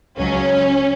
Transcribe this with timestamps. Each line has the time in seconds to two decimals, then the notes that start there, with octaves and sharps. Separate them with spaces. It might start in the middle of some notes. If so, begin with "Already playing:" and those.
0.18 C#2 C#3 F#3 C#4